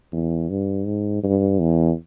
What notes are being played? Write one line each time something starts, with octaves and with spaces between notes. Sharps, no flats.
E2
G2
G#2
G2
E2